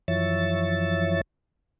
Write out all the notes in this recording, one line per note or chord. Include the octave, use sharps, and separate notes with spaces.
F#2 E3 F3 C#5 E5 A6